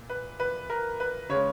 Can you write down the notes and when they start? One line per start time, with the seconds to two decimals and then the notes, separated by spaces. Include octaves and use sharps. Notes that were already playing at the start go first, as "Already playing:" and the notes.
Already playing: A#2
0.10 B4
0.40 B4
0.70 A#4
1.00 B4
1.29 C#3 G#3 C#5